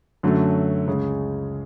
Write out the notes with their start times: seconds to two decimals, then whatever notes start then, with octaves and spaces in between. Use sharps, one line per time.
0.23 F#2 D3 F#3 A3 C#4
0.87 C#2 C#3 G#3